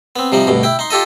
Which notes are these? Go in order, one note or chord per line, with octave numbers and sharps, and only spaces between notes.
B3 C4
C3 F3 G3 D#4
D2 G2 B2
E4 G5
D#4 C6
F4 G4 A4 D#5